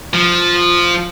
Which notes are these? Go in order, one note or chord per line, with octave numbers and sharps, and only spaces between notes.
F3